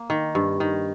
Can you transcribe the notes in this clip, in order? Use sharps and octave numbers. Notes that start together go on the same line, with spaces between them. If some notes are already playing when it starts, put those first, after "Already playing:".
Already playing: A#3
D#3
G2
D#3